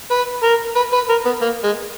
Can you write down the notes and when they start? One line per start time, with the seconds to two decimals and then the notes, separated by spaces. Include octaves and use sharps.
0.11 B4
0.43 A#4
0.76 B4
0.93 B4
1.09 A#4
1.25 B3
1.41 A#3
1.63 G#3